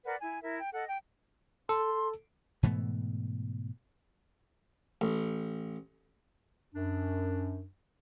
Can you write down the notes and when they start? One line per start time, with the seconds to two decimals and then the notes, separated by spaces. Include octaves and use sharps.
0.05 A#4 B4 D5 F#5
0.20 E4 G#5
0.42 E4 A#4 E5
0.60 G5
0.73 A4 D#5 F#5
0.87 G5
1.69 A4 C6
2.63 G#2 B2 E3 A3
5.01 A1
6.75 F#2 D4